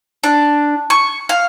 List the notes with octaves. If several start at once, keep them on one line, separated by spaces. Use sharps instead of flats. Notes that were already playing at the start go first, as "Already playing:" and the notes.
D4
C#6
F5